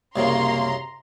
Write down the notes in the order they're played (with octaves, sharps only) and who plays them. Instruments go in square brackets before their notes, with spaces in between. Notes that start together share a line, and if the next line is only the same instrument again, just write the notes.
[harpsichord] C2 F#2 C#3 [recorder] A#3 [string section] A#5 C6